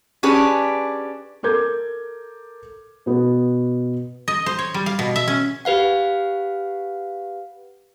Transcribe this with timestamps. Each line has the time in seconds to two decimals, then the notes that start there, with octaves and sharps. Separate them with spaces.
0.23 C#4 D4 G4 G#4 B4
1.43 A4 A#4 D6 G6 G#6
3.06 B2 B3
4.28 D#5
4.46 C5
4.59 C#5
4.74 G3
4.86 F5
4.99 B2
5.16 E5
5.28 C#4
5.65 G4 B4 F5 F#5